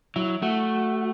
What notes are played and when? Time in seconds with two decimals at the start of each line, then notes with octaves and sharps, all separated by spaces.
0.16 F#3 E4
0.42 A3 F#4